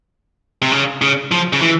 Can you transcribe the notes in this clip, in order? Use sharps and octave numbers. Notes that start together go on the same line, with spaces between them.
C3
C#3
C#3
F3
C#3
E3